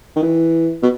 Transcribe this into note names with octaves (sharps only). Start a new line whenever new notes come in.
D#3
E3
B2